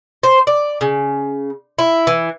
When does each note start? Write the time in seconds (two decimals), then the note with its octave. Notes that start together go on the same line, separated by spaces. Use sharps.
0.23 C5
0.47 D5
0.81 C#3
1.79 E4
2.07 E3